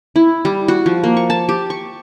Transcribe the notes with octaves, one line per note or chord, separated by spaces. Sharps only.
E4
G3
F#4
F3
A#3
C#6
A5
G4
C#6